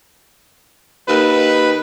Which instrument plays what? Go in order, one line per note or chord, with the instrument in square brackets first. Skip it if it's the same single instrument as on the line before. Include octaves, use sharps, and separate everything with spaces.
[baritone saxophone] D#2 [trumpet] B4